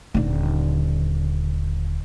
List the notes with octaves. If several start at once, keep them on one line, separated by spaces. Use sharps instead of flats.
D#1 D3